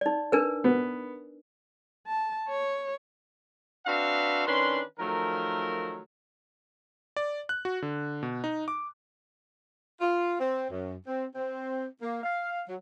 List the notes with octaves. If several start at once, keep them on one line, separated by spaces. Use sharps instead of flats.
D#4 D5
D4 A#4 B4
B3
A5
C#5
C4 D4 F#4 B4 E5 F5
D#3 C#4 D4 B4 C6
D#3 F3 F#3 A3 A#4
D5
F#6
F#4
D3
B2
D#4
D6
F4
C4
F#2
C4
C4
A#3
F5
F#3